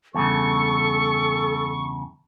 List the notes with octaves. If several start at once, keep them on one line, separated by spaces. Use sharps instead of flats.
E2 G2 C#3 A4 C#6